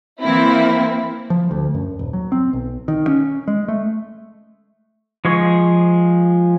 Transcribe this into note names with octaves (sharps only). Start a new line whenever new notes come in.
E3 A#3 C4 E4
F3
D2
F#2
D#1
F#3
C4
B1
D#3
C#4
G#3
A3
F3 G#3 G#4 C#6